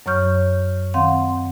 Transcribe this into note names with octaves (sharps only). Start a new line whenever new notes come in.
F#2 F#3 C#5 C#6 F6 G6
D#3 C4 F5 F#5 C6